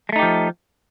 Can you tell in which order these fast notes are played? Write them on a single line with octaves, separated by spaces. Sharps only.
G#3 A3 D#4 G4 F3